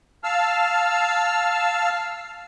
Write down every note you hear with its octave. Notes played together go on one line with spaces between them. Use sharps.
F5 A5 E6 F6